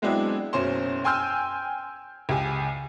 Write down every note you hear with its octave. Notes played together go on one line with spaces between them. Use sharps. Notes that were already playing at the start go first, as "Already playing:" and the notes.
F#3 G#3 B3 C4 D4 E4
F#1 B2 C#4 C5 C6
G5 G#5 C6 E6 F6 G6
C#2 G4 G#5